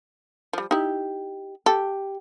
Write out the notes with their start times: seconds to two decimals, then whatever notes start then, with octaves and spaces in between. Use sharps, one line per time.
0.53 F3 G3
0.71 D#4 E4 G4
1.66 G4 A4